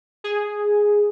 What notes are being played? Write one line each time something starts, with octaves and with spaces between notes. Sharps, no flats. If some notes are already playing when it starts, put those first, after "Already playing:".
G#4